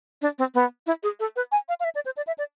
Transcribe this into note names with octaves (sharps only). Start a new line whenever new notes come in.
D4
C4
B3
E4
G#4
A4
B4
G#5
F5
F5
E5
D5
C5
D5
E5
D5